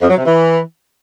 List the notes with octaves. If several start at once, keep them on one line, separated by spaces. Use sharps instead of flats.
F2
F#3
C3
E3